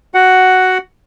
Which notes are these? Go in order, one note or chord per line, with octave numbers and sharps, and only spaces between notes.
F#4 F#5